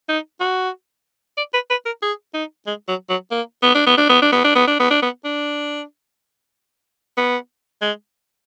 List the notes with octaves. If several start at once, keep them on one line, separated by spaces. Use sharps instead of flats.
D#4
F#4
D5
B4
B4
A#4
G#4
D#4
G#3
F#3
F#3
A#3
B3
D4
B3
D4
B3
D4
B3
D4
B3
D4
B3
D4
B3
D4
B3
G#3